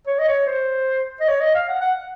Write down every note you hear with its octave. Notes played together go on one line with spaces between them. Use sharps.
C#5
D#5
C#5
C5
D#5
C#5
D#5
F5
F#5
F#5